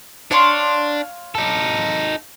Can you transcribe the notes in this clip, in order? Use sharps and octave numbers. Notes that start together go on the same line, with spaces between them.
D4 C#5 F5 C6
D#4 A4